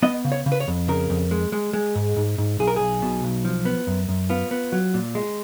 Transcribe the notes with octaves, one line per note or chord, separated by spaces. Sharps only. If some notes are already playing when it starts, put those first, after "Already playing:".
B3 D#5
C#3
C#5
C#3
B4
C#5
F2
C#3 A#4
F2
G#3
G#3
G#3
G#2
G#2
G#2
B1 G#4
A#4
B1 G#4
B2
B1
F3
B3
F#2
F#2
B3 F4
B3
F#3
A#2
G#3